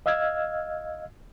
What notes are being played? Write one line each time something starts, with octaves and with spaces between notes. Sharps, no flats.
D#5 F5 E6 F6 G#6